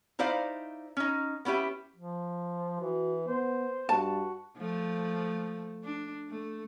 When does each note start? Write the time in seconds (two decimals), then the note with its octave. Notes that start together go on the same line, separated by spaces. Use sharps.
0.19 D#4 E4 C5 D5 F5
0.97 C#4 D#4
1.45 B3 C#4 E4 G4 E5
1.96 F3
2.80 E3 F#4
3.28 B3 C5
3.89 G2 F#4 A5
4.58 F3 A3
5.83 D4
6.30 A3